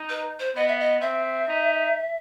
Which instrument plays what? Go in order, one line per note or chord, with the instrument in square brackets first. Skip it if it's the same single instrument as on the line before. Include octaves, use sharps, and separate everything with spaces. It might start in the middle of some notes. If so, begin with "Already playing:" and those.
Already playing: [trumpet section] D#4
[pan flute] B4
C5
[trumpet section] B3 [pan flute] D#5
[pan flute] E5
D#5
[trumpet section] C4 [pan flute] E5
[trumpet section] D#4